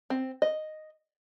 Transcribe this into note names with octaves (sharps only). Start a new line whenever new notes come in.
C4
D#5